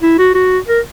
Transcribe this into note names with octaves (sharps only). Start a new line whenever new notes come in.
E4
F#4
F#4
A#4